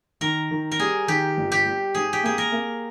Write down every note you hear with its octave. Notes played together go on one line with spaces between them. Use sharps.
D#3 A#4
D#3
A#4
G3 G#4
D#3 G4
G1
G4
G3
G#2 G#4
G4
A#3 G#4
A#4
A#3